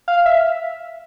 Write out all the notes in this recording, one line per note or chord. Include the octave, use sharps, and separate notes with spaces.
F5
E5